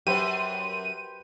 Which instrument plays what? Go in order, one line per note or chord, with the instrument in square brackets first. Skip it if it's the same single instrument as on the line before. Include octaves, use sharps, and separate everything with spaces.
[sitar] F#2 [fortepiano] G4 B4 C5 [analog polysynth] D#7